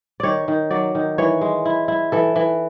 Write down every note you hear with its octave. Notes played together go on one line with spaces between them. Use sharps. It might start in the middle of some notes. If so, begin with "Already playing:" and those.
D#3 C#5 D5
D#3
F#3 D5
D#3
E3 C#5
G#3
E4
E4
E3 A4
E3